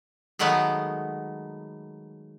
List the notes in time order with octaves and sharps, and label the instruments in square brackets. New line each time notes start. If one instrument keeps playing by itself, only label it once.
[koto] D#3 F#3 G#3 A3 B3